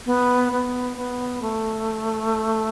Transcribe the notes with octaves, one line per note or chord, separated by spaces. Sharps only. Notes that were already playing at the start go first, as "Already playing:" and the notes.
B3
B3
B3
A3